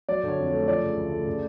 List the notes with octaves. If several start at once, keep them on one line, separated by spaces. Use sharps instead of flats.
F#3 D5
D3 C#5
F2
C#5
A3
F3 D5
C#3
D2
A3
C#3